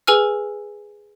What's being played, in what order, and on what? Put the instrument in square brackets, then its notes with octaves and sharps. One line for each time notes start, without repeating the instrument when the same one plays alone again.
[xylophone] G#4 B4 G#5 E6 F6